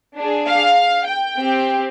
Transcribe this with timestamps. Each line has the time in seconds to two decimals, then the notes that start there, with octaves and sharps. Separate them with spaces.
0.17 D4 G#4
0.47 F5
1.07 G5
1.37 C4 G4